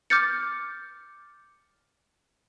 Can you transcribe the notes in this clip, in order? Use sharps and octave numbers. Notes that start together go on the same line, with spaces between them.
D6 F6 G6 A6 C#7